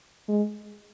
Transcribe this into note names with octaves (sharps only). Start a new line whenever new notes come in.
G#3